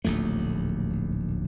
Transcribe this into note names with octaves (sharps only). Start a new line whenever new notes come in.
D1 A#1 D#2 A3